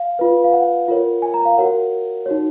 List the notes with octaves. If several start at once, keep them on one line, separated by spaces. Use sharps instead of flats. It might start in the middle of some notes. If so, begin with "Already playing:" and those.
Already playing: F5
F4 B4
F5
F#5
F4 A#4 C#5
G#5
A#5
F5
F#4 A#4 C#5 F#5
D#4 F#4 C#5